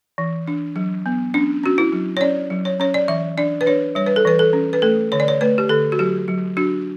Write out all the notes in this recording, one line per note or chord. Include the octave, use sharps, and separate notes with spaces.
E3
D4
F#3
B3
C#4 D4
C#4 F#4
E4
F#3
C#5
C#4 D5
F#3
C#5
C#4 C#5
D5
E3 E5
D4 D5
B4
D4 C#5
G3 C#5
B4
A4
E3 B4
A4
C#4
B4
A3 A4
D3 C#5
D5
C#5
A3 B4
G4
D3 A4
F#4
F#3 G4
F#3
D4 F#4